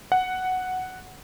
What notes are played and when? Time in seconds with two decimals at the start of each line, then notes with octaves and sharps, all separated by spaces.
0.12 F#5